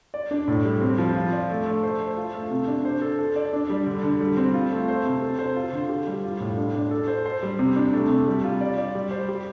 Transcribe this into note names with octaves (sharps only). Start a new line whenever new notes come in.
D5
D4
A2
G3
C4
F3
F4
D5
A3
A3
C5
C5
F4
A3
C3
D4
C5
A4
A4
D5
D4
G3
D3
D3
G3
C4
F4
A3
C5
C3
A4
C5
F4
D3
G4
G3
F4
A2
D4
D4
A4
C5
C5
G3
C3
D4
A3
C3
G3
F4
D5
D5
G3
C5
G4